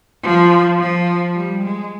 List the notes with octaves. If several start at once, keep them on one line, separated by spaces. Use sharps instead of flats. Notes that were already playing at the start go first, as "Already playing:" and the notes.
F3
F3
G3
G#3